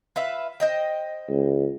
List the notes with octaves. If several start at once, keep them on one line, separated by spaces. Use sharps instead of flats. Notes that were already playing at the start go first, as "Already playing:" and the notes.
F4 B4 E5
C5 D#5 G5
C#2